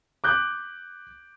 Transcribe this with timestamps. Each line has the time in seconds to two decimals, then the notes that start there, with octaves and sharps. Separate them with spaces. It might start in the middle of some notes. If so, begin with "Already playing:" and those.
0.24 D6 F#6 G6